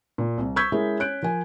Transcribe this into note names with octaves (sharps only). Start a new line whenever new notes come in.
A#2
C2
C#6 E6 G6 G#6 B6
G#3 C#4 E4 G#4 A#4
C#4 F#6 G6 D7
F3 A#4 G#5